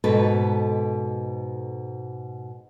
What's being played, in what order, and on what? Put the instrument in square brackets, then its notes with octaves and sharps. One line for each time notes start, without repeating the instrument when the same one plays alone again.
[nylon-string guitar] G#2 B2 A4 B4